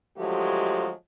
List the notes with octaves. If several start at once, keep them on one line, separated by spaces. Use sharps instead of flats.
D3 F3 F#3 G#3 A3 G4